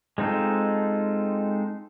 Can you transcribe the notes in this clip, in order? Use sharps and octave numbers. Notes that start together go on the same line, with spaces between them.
G#3 C4 D#4 F4 A4